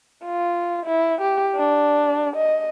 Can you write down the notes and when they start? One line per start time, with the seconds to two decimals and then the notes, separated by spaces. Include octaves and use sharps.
0.25 F4
0.86 E4
1.21 G4
1.56 D4
2.36 D#5